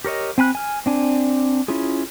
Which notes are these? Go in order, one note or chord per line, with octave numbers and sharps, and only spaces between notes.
G4 A#4 C#5 D#5
C4 G#5 B5 F#6
G#5 F6
C4 D4 G#5
C#4 E4 F4 G#4